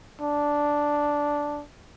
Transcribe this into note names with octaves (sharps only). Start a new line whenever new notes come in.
D4